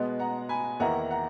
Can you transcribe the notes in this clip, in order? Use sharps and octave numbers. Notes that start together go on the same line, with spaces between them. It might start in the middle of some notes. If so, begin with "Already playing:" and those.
Already playing: B2 G#3 B3
F#5 A#5
G#5 B5
E2 D#3 A#3 E4 F#5 A#5
F#5 A#5